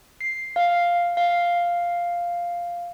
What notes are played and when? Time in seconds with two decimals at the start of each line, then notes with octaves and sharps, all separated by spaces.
0.21 C7
0.56 F5
1.17 F5